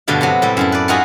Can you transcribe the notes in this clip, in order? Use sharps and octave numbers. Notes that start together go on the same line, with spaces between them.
G2 B2 D3 A3 F5
C3 F#3 B3
A2 G3 E5
F#2 E4 A4
B4 D5
B3 D#4 F4 F#4 G#4